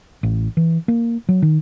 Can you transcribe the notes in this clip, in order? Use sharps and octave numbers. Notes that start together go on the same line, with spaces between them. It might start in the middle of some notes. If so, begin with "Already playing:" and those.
A1
E3
A#3
F#3
D#3